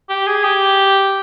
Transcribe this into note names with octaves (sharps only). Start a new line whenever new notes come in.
G4
G#4
G4